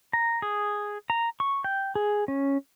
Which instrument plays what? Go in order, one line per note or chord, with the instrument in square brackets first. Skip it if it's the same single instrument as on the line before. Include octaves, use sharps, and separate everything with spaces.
[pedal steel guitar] A#5
G#4
A#5
C#6
G5
G#4
C#4